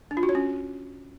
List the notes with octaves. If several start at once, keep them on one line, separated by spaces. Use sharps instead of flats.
D4
F4
F#4
C#5
C#4